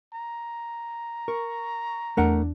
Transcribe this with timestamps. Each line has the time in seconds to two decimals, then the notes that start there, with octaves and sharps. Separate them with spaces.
0.14 A#5
1.28 A#4 C#6
2.17 E2 A3 D4 A#4 F#5